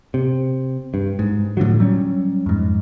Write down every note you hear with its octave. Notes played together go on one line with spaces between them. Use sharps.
C3
G2
G#2
A2 D3 F3 F#3
F#3 G3 C#4
F2 G#2